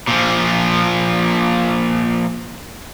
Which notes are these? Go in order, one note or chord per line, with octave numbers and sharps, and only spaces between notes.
A#2 F3